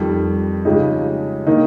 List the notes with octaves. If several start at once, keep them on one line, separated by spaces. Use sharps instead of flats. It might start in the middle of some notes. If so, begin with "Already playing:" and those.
Already playing: F2 D#3 G3
C#3 F3 G#3 D#4 G4
D#3 A#3 D#4